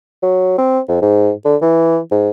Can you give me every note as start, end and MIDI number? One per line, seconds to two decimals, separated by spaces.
0.23 0.56 54
0.58 0.80 60
0.88 1.01 41
1.02 1.31 44
1.45 1.56 50
1.62 1.99 52
2.11 2.30 44